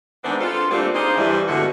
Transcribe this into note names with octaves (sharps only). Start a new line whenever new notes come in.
D#3 G#3 B3 C4 D4
F4 A4
G3 A3 A#3 C4 D4 F4
D#4 F4 G#4 C5 D5
G2 E3 G3
G2 B2 D3 G#3 A3 F#4